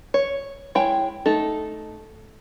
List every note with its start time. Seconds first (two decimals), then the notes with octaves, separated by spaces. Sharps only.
0.14 C#5
0.75 G#3 E4 C#5 G5
1.26 A3 D#4 A4